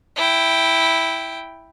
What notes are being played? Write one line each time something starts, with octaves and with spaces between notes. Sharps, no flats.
E4 G5